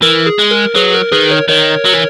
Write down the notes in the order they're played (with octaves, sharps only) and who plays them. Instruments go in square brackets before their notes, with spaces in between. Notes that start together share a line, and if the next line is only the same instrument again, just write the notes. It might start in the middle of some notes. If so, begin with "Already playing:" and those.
[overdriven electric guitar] E3 [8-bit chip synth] A#4
[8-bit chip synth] G#4
[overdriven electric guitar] G#3
[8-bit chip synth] A#4
[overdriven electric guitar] F#3 [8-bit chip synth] G#4 B4
[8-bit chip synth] A#4
[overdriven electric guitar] D#3 [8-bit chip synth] G#4 B4
[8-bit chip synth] A#4 C#5
[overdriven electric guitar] D#3 [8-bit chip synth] A#4 C#5
[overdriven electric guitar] F#3
E3